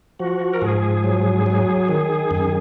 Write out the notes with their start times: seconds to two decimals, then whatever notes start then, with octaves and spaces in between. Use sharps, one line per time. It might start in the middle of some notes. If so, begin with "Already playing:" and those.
0.19 F3 F#4
0.54 A#4
0.62 G#2 G#4
1.04 F#3
1.46 F#3
1.89 D#3
2.31 F#2